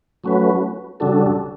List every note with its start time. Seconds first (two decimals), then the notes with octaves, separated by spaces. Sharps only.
0.24 F#3 A3 C#4 F#4 B4
1.00 C#3 G3 D4 F#4 A4